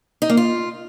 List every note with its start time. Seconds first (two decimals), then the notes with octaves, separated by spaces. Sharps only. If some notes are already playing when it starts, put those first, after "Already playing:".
0.22 D#4
0.30 A#3
0.37 F4